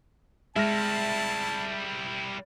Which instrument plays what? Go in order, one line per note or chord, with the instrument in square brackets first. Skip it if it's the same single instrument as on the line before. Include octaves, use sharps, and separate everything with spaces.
[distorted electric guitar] G3 E4 [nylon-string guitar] G#3 [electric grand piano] E5 F6 A#6 [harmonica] A5